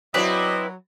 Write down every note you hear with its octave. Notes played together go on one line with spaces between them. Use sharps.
F#3 C4 E4 B4 D5 D#5